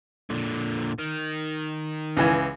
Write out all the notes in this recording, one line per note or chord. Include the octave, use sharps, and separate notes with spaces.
A#2 D3
D#3
C#2 E3 G#5